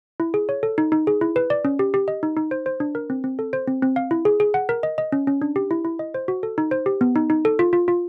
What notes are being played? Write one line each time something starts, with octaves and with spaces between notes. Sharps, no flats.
E4
G#4
C#5
A4
D#4
D#4
G#4
E4
B4
D5
C#4
G4
G4
D#5
D#4
D#4
C5
C5
D4
A#4
C4
C4
A4
C5
C4
C4
F5
E4
G#4
G#4
F#5
A#4
D#5
D#5
C#4
C#4
D4
G4
E4
E4
D#5
C5
F#4
A4
D#4
C5
G4
B3
D#4
D#4
A4
F4
F4
F4